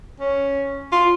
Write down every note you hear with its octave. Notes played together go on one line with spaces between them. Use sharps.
C#4
F4